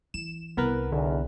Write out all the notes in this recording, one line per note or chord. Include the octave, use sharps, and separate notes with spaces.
E3 E7
C2 B3 A#4 B4
B1 E2 D3